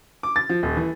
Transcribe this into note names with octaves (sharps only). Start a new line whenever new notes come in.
D6
A6
F3
D#1
E3